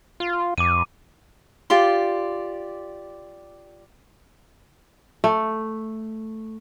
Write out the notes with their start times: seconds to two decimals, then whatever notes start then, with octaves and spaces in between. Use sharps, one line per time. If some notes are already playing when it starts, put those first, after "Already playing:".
0.20 F4
0.58 F2 D6 D#7
1.70 F4 G4 D5 C6
5.24 A3